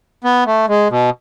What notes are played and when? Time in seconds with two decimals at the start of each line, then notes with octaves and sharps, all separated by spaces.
0.24 B3
0.46 A3
0.68 G#3
0.90 B2